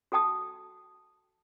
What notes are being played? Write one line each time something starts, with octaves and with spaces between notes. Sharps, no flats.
F#4 A4 G5 A5 D#6